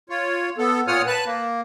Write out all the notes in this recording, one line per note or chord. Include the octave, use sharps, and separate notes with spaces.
F4 C#5
B3 A4
A#2 F4 C#5 F#5 D#6 F6
B4 A5 F#6
A#3